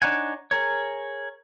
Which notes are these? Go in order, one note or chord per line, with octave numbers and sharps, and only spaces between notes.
D4 D#4 C#5 F#5 G#5
G#4 A#4 C#5